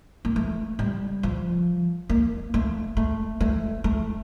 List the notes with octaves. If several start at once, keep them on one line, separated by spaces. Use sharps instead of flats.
A#3
A3
G3
F3
A#3
A3
A3
A3
A3